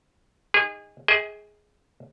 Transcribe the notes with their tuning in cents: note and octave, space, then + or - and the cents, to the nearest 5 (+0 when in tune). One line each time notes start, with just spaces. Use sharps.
D#4 +0 G#4 -30
G#4 +5 D#5 +40 G5 +40